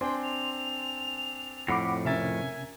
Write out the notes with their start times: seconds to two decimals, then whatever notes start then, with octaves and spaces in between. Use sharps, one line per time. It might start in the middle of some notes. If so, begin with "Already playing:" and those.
0.01 C4 D4 G5 G#5 C6
0.23 F7
1.68 F2 A2 F#5 B5 D6
2.05 C3 C#4 A#4 E5 G#5 A6